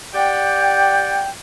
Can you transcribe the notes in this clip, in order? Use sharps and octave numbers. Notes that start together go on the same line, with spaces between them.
G4 D5 F#5 G5